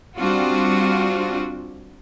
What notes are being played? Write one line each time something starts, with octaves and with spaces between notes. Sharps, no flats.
G3 C4 D4 F4 F#4